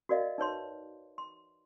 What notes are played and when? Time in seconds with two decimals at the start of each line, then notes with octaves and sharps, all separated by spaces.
0.09 F#4 A#4 D5 D#5 F5
0.38 D#4 B4 C#5 C6
1.18 C6